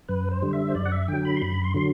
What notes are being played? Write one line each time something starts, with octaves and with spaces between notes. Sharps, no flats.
F#2 B4
C5
D3 G3
E5
C5
F#2 D5
F#5
E5
D3 F#3 G5
B5
C6
F#2 B5
C6
D3 F#3 C6